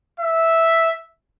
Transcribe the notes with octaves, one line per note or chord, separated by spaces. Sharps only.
E5